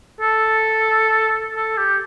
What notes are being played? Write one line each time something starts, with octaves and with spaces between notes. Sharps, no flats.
A4
A4
G4